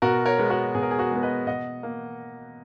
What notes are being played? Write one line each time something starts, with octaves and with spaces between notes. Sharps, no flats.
B2 F#4 A#4
A#4 C#5
G#3 B3
F#4 A#4
B2 G#4
A#4
G#4
F#4 A#4
G#3 B3
B4 D#5
B2 D#5 F#5
A#3